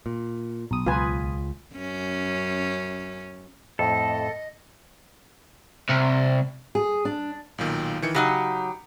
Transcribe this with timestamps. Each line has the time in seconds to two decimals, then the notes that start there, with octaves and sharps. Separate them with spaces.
0.06 A#2
0.71 B1 D#6
0.86 C#2 F4 B4 G#5
1.75 F#2 C#4
3.79 F2 A2 A4 D#5
5.90 C2
6.75 G#4
7.05 D4
7.58 B1 A#2 D#3
8.02 D#3 E3 C#7
8.15 C#3 F#3 D#4 G4